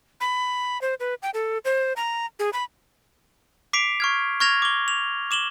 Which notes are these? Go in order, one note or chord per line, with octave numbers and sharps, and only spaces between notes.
B5
C5
B4
G5
A4
C5
A#5
G#4
B5
D6 B6 C7 D7 F7
C#6 F6 G#6
C#6 F6 G#6 A#6 F7
D6 G7
F7
D6 E7 F#7 G7